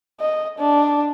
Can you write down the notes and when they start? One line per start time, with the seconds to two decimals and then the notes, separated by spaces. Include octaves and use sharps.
0.20 D#5
0.59 D4